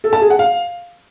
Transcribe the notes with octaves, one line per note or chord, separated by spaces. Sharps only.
A4
A5
G#4
F#5
F5